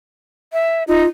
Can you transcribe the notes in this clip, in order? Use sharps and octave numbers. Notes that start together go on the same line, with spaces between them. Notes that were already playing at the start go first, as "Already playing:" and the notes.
E5
D#4 F4